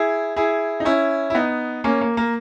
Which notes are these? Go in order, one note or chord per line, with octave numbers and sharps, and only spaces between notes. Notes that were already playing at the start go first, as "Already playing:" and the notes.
Already playing: E4 G#4
E4 G#4
D#4
C#4 E4
E4
B3 D#4
A#3 C#4
A#3
A#3